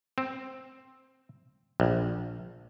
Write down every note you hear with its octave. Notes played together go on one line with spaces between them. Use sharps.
C4
A#1